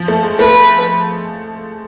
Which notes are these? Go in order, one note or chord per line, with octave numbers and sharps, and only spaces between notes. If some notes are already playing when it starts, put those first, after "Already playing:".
Already playing: F3
A3
G#3
A3 B4